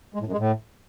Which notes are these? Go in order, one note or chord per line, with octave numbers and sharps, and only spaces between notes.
G#3
A2
F#2
G#3
A2